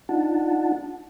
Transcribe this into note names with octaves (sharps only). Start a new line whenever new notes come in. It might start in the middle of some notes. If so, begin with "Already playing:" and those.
D4 D#4 F4 F#5 A5